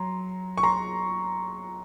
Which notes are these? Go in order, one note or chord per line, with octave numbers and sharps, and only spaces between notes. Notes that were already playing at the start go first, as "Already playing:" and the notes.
Already playing: F#3 A#5 C6
C#6
A#5 C6